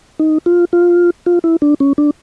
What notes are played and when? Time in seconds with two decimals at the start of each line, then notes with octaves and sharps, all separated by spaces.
0.19 D#4
0.46 F4
0.73 F4
1.26 F4
1.44 E4
1.62 D4
1.80 C#4
1.98 D4